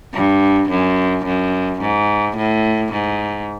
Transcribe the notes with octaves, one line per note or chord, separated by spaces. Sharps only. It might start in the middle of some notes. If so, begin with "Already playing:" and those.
G2
F#2
F#2
G#2
A2
G#2